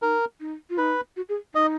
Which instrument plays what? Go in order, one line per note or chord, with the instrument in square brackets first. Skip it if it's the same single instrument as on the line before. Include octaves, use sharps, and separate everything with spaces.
[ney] D#4 [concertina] A#4
[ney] D#4
F4
[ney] D#4 [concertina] B4
[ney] F#4
G#4
[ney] D#4 [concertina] D#5